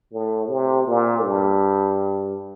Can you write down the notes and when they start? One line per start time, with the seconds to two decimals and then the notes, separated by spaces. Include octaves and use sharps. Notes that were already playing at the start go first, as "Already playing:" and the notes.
0.13 A2
0.50 C3
0.87 A#2
1.24 G2